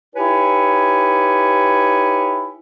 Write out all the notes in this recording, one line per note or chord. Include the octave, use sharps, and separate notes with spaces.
D#4 E4 G4 B4 C#5 G#5